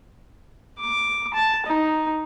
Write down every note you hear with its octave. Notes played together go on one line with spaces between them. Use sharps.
D6
A5
D#4